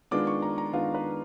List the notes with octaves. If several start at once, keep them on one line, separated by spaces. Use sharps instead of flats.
D#3 G#3 B3 D4 F4 D6
C#6
A#5
A#5
D#3 G#3 B3 D4 F4 F5
B4